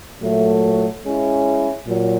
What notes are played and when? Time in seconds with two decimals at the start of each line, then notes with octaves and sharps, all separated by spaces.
0.21 A#2 F#3 A3
1.03 G#3 C#4 E4
1.86 A#2 F#3